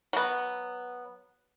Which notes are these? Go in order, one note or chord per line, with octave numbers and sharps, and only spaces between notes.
F#3 B3